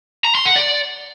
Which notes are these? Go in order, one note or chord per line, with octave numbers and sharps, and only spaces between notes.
A#5
C6
F#5
D5